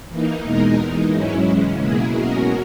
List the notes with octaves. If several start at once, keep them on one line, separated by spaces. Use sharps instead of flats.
E3 A#3 D#4
E2 B2 G#3 D#4 A#4
E3 G#3 D#4
G#2 F#3 C#4 E4
C#3 E3 G#3 C#4
B2 F#3 A#3 E4 G#4
B2 G#3 C#4 F#4 A#4